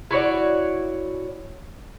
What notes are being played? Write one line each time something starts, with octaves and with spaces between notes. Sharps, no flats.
E4 F#4 C#5 D5